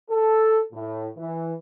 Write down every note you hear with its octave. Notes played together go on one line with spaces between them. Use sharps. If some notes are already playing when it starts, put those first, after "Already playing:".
A4
A2
E3